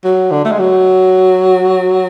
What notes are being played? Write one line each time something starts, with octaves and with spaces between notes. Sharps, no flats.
F#3
D3
A3
G#3
F#3